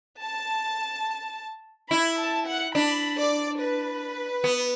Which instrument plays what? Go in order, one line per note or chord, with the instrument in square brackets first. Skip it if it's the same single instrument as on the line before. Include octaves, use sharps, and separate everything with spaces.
[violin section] A5
[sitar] E4 [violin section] B5
[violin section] A5
F#5
[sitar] D4 [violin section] B5
[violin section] D5
B4
[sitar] B3